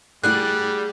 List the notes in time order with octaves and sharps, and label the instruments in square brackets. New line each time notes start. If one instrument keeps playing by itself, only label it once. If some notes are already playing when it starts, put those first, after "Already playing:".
[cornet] G3 [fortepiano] A3 E4 [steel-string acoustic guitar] G#4 D5 F#5 [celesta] F#6